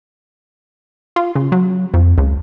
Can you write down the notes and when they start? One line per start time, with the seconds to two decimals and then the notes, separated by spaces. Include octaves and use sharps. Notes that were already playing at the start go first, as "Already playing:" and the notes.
1.16 F4
1.36 C#3
1.52 F#3
1.94 F2
2.18 C#2